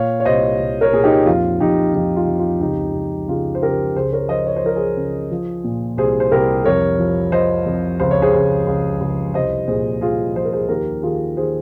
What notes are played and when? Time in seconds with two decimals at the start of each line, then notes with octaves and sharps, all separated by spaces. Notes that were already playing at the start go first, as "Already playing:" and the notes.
Already playing: A#2 C#5 F5
0.20 C#5
0.25 C2 C5 D#5
0.60 C2
0.81 A#4 C#5
0.93 A#2 G#4
1.04 D#4 G4
1.26 F2 F4
1.60 F2 D#4 G4
1.94 F2 D#4
2.16 F4
2.27 F2
2.39 F4
2.61 C#2 D#4 G4
2.95 C#2
3.28 C#3 F4 G#4
3.55 C5
3.63 C#3 G4 A#4
3.95 C#2 G#4 C5
4.13 A#4 C#5
4.29 F3 C5 D#5
4.47 C#5
4.56 C5
4.64 F3 A#4
4.76 G#4 C5
4.97 C#3
5.31 F3
5.64 A#2
5.97 C2 G#4 C5
6.20 C5
6.31 C2 G4 A#4
6.65 F2 A#4 C#5
6.98 F3
7.32 F3 C5 D#5
7.66 F2
8.00 C#2 C5
8.11 C#5
8.22 G#4 C5
8.34 C#2
8.67 C#2
9.01 C#2
9.34 C2 C5 D#5
9.68 A#2 G#4 C5
10.01 C2 F4 G#4
10.35 F3 C5
10.45 A#4
10.53 G#4 C5
10.69 D#2 G4 A#4
11.02 D#3 F4 G#4
11.36 D#3 G#4 C5